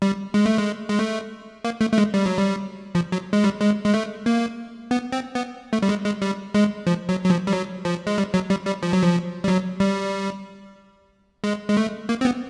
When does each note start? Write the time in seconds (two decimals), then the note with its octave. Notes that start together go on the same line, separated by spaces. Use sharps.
0.02 G3
0.34 G#3
0.46 A3
0.58 G#3
0.89 G#3
0.99 A3
1.64 A#3
1.81 A3
1.92 A3
1.98 G#3
2.14 G3
2.26 F#3
2.37 G3
2.95 F3
3.12 F#3
3.33 G#3
3.44 G3
3.61 G#3
3.85 G#3
3.94 A3
4.26 A#3
4.91 B3
5.12 C4
5.35 B3
5.73 A3
5.82 G3
5.89 G#3
6.06 G#3
6.22 G3
6.54 G#3
6.87 F3
7.09 F#3
7.24 F#3
7.30 F3
7.47 G3
7.53 F#3
7.85 F3
8.07 G#3
8.18 G3
8.34 F#3
8.50 G3
8.67 G3
8.83 F3
8.93 F#3
9.03 F3
9.44 G3
9.48 F#3
9.80 G3
11.44 G#3
11.69 G#3
11.77 A3
12.09 A#3
12.21 C4
12.25 B3